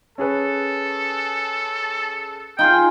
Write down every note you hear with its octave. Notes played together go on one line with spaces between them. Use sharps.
C#4 G#4 A4 B4
D#4 F4 G#4 G5